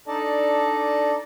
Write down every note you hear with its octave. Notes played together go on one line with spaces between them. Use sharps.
D4 D#4 A4 D5 D#5 A5